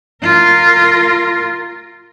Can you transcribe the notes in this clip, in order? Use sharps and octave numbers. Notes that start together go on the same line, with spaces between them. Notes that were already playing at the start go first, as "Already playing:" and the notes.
F4 A#4